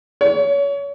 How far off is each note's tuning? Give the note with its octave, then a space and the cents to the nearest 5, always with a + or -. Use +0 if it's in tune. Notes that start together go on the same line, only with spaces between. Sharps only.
C#5 +30